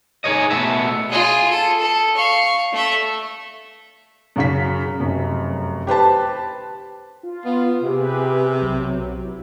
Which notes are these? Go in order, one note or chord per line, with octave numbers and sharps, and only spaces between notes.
D#4 G#4 B4 C#5 D#5
B2 A3 B3 E5
F4 G#4
A4
A4
F5 C#6
A3 E5
F#2 C#3 B6
F1 F#2
G4 B4 C5 A5
F4
B3
C3 G4 G#4 B4
B1 F#3
E4